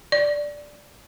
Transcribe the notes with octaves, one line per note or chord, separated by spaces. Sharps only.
D5